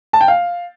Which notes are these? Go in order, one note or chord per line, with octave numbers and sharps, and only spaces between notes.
A5
G5
F5